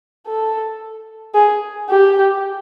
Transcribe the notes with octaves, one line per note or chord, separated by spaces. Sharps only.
A4
G#4
G4